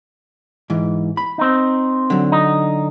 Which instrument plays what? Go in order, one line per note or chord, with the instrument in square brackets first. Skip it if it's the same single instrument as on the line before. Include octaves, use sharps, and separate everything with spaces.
[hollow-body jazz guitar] G#2 E3
B5
[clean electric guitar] C4 D#4
[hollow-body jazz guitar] D3 F#3
[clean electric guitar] D#4